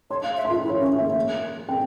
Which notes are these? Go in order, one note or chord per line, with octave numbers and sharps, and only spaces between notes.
C#5 C6
F5
E5
C6
F4
E4
C#5
C#4 E5
A#3 E5
C4 G5